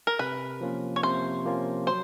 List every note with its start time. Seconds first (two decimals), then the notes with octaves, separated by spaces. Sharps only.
0.07 A#4
0.19 C3 B4
0.61 F3 A#3 C#4 F4
0.96 C#5
1.03 C3 C5
1.45 F3 A#3 C#4 F4
1.87 F#3 C5